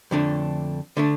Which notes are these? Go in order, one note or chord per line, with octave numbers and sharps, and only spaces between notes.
F2 D3 A3 D4
D3 A3 D4